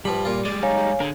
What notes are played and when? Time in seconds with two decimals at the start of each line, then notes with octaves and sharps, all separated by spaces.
0.05 G2 F3 G3 B5
0.25 A#2 F4
0.45 G3 G#3 D5
0.63 D#4 C#5 F5 G#5
1.00 D3 G#4 A#4